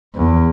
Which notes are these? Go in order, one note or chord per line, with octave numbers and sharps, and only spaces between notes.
E2